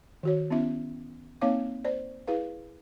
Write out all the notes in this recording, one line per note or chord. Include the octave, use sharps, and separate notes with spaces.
D#3 F#4 C#5
B3 C#4 E4 E5
A#3 C4 D#4 C#5 F5 D6
C5 D5
E4 G#4 B4 F5